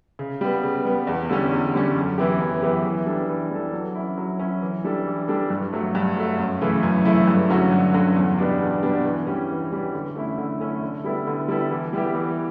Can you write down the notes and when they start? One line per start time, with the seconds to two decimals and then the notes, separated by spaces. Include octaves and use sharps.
0.19 C#3
0.41 G3 B3
0.63 C#3
0.85 G3 B3
1.07 E2
1.29 D3 G3 C#4
1.51 E2
1.74 D3 G3 C#4
1.96 F#2
2.18 E3 B3 E4 G4
2.40 F#2
2.62 E3 B3 E4 G4
2.85 E3
3.06 G3 D4 A4
3.29 E3
3.51 G3 D4 A4
3.73 F#3
3.95 C#4 E4
4.18 F#3
4.39 C#4 E4
4.62 E3
4.84 G3 D4 A4
5.06 E3
5.28 G3 D4 A4
5.50 G2
5.73 F#3 A3
5.95 G2
6.17 F#3 A3
6.39 F#2
6.61 C#3 E3 A3 E4
6.83 F#2
7.05 C#3 E3 A3 E4
7.27 G2
7.50 D3 F#3 C#4 F#4
7.72 G2
7.94 D3 F#3 C#4 F#4
8.16 E2
8.39 B2 G3 B3 D4
8.60 E2
8.83 B2 G3 B3 D4
9.05 E3
9.27 G3 C#4
9.49 E3
9.72 G3 C#4
9.93 D3
10.15 A3 C#4 E4
10.38 D3
10.60 A3 C#4 E4
10.82 D3
11.04 G3 B3 E4 A4
11.27 D3
11.48 G3 B3 E4 A4
11.71 E3
11.93 G3 B3 E4 G4
12.15 E3